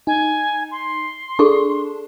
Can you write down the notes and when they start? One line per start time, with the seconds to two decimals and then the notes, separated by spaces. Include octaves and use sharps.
0.07 D#4 G#5
0.71 C6
1.39 D4 G#4 A4 C#6